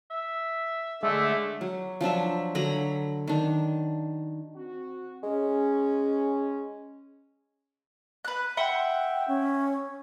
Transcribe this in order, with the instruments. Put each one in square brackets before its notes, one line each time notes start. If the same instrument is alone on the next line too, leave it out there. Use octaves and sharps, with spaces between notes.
[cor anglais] E5
[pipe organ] D3 A3 [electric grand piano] G#3 [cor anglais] D5 [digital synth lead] E5
[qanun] F#3
F3 F#3 D4 E5
D3 F#3 A#5 B5
D#3 D4
[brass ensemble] C4 F#4
[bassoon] G#3 [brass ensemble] C#4
[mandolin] B4 F#6
[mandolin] E5 F#5 C6 [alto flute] G5
[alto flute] C#4